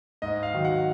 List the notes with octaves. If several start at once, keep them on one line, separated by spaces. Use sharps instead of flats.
G#2 D#5
F5
D#3 F#3
F#5